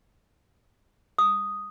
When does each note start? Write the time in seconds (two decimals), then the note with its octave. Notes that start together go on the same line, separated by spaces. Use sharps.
1.18 D#6